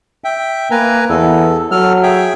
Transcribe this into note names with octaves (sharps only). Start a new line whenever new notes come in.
E5 G5
A#3 B4 G#5 A#5
E2 A4
F#3 A4 F6
G#4 E5 G5